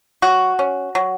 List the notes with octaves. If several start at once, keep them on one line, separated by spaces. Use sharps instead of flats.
F#3 F#4
C#4
F#3